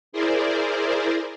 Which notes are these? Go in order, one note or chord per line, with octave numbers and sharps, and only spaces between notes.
E4 G#4 A#4 C5 D5